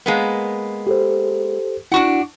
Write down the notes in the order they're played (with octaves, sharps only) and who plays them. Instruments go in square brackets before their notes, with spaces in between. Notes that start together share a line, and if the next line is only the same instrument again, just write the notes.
[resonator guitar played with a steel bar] G#3 A#3 B3
[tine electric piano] G4 A4 C5
[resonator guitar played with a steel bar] D4 F#4 F#5 [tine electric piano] E4 C#6